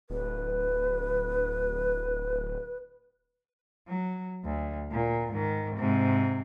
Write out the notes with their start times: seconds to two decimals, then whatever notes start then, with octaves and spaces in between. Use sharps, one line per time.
0.10 D1 B4
3.88 F#3
4.45 D2
4.91 A#2
5.32 G#2 D#3
5.76 G#2 C3